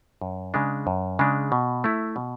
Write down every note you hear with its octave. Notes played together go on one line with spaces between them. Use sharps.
F#2
C#3 G#3 D4
F#2
C#3 G#3 D4
B2
A3 E4
B2